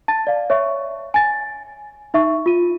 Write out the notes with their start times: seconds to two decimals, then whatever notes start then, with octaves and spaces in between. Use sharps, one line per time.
0.08 A5 A6
0.27 D5 F5
0.50 C#5 E5 C#6
1.14 G#5 A6
2.14 D#4 E5 C#6
2.46 F4 D#7